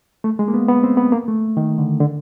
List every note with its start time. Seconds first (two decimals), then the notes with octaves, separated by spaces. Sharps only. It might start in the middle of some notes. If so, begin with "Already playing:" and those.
0.24 A3
0.39 G#3
0.48 A#3
0.54 B3
0.68 B3
0.83 C4
0.97 B3
1.12 A#3
1.28 A3
1.57 D#3
1.78 D3
2.00 D3